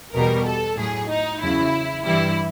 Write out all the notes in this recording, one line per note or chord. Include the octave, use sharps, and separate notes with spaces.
E2 B2 G3 A#4
A4
A2 F#3 G#4
D#4
E2 C#3 F#3 E4
G2 E3 G3 E4